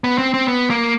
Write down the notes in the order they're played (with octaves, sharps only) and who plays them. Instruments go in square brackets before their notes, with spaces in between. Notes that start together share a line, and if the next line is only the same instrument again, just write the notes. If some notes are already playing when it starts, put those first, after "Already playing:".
[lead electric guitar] B3
C4
C4
B3
A#3